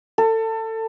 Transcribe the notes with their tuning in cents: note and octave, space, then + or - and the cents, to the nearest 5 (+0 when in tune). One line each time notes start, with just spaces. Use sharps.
A4 +25